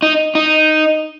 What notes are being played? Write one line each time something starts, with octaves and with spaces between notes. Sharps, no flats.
D#4
D#4